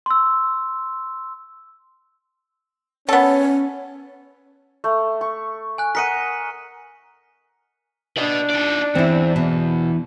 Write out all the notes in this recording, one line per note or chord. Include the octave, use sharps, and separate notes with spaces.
C6 E6
B3 C#4 A4 C#5
A3
C#6
G#5 F#6
A#4 D#5 F#5 B6 C#7 D#7
D4 B4 D#5
D#4 D5
E2 C4 E4
B2